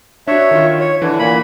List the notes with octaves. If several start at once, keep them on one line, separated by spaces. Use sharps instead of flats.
D4 F#4 C#5 E5
D#3 F4
C#5
D3 E3
A#2 A#3 B5